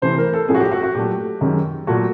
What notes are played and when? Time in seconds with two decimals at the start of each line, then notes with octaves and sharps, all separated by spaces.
0.02 C3 E3 A3 C5
0.18 A#4
0.33 A4
0.48 A2 F3 G#3 G#4
0.55 F#4
0.60 G4
0.71 F#4
0.83 F#4
0.95 A#2 F#3 A3 G4
1.41 F#2 D#3 G#3
1.87 A#2 F#3 A3 F#4